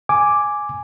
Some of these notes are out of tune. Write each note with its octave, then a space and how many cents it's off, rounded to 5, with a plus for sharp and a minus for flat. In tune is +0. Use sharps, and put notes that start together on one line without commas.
G#5 +0 D6 +0